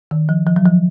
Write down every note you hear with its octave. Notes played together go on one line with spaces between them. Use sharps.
D#3
F3
F3
F#3
F3